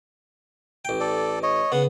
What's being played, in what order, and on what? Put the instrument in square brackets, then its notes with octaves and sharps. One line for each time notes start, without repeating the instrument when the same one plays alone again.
[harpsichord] A1 G5
[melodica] A4 D5
C#5 D#5
[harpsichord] C#3 B3 [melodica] F#5